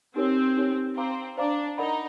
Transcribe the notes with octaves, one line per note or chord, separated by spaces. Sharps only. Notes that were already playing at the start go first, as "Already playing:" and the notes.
C4 D#4 G4 A#4 C#5
D#4 G4 A#4 C#5
C4 C5 F5 A#5 D6
D4 C5 F5 A#5 D6
D#4 A#4 D5 F#5 B5